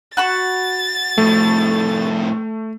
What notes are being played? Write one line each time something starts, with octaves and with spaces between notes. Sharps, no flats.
F#4 B5 C#6 A6
F2 A2 A3